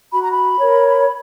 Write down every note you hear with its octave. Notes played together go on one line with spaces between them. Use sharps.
F#4 B5
A#5
B5
A#4 C#5